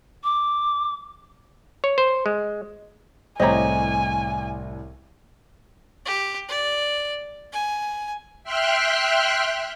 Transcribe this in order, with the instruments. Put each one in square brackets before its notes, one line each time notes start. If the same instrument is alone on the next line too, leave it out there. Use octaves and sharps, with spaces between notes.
[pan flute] D6
[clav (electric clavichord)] C#5
C5
G#3
[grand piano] C2 A2 [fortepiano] C4 G4 C#5 [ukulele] D#5 A#5 [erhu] G#5
[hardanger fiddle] G4
D5
G#5
[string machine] E5 G5 C6 F6 F#6